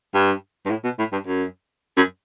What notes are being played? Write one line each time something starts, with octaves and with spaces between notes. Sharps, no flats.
G2
G2
A2
B2
A2
G2
F#2
F#2